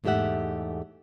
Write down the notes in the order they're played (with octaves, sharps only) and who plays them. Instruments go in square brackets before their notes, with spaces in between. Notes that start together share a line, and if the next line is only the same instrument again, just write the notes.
[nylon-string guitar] E2 G#2 A3 G4 E5 F#5